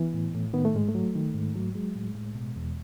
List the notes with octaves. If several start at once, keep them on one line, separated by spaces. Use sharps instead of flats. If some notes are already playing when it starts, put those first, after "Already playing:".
Already playing: E3 B3
A2
A2
D#3 B3
A3
G#2 G#3
A3
F#3
D#3
G#2
F#3
F#3 G#3
A2
A2
B2
E2